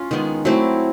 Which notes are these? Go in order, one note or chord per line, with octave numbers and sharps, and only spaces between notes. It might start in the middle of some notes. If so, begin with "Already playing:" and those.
Already playing: C#4 F4
D#3 G#3 B3
F#3 A3 C4 E4